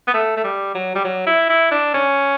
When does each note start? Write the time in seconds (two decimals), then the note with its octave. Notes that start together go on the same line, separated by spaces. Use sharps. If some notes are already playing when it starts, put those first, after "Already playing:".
0.07 B3
0.14 A3
0.37 A3
0.44 G3
0.75 F#3
0.95 G3
1.04 F#3
1.27 E4
1.49 E4
1.71 D4
1.94 C#4